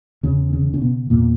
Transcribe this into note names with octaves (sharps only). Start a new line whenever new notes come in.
E2 C#3 C#4
C#3 C#4
C#3
C#4
B2 B3
E2 A#2 A#3